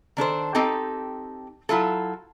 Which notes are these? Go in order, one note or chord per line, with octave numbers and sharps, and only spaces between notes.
D#3 D4 A4 C5
C4 D#4 G4 A4
F#3 E4 F4 A4